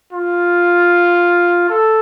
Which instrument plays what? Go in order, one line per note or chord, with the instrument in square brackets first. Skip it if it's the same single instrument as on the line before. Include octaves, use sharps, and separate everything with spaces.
[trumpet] F4
A4